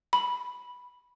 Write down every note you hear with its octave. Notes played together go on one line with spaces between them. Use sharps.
B5